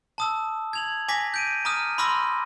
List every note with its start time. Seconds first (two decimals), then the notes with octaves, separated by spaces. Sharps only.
0.18 A5 D#6 E6
0.73 G#6 F7 F#7
1.08 G#5 D6 A#6 B6
1.34 G6 D7 D#7
1.65 A#5 D6 D#6 F6 D#7
1.98 B5 C6 D6 E6 F6 A#6